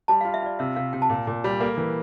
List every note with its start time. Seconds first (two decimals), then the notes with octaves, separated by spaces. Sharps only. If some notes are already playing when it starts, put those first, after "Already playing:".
0.08 G3 A5
0.21 F4 F5
0.34 E5
0.42 F4 D5
0.59 C3 E5
0.76 C3 F5
0.93 C3 G5
1.02 A5
1.10 A#2 G5
1.27 A#2
1.44 G3
1.61 A#3 A4
1.77 E3